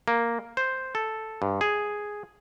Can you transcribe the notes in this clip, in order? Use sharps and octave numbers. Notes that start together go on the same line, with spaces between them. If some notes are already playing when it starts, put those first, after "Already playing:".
A#3
C5
A4
G2
G#4